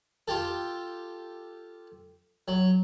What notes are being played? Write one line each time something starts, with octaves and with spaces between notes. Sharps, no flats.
F4 G4 A4
F#3